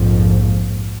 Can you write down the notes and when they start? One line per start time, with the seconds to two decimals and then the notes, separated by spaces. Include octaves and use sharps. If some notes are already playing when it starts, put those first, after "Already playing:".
Already playing: A#1 F2 G#2 F3